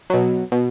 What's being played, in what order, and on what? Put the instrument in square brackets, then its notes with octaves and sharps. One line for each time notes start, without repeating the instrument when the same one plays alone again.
[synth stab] B2 F#3
B2